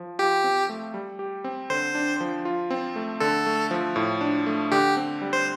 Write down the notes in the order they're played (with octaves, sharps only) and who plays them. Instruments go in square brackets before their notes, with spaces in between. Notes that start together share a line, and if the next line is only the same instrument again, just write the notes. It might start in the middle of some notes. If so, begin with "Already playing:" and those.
Already playing: [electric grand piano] F3
[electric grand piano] F4 [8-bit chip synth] G4
[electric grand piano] C4
A3
G3
G4
C4
[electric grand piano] D3 [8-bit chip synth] C5
[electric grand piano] D4
F3
F4
C4
A3
[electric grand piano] D3 [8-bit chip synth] A4
[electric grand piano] A3
F3
A2
D4
A3
[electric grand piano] D3 [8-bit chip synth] G4
[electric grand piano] C4
G3
[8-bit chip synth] C5